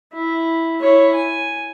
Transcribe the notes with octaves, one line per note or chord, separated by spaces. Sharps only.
E4
E4 C#5
G#5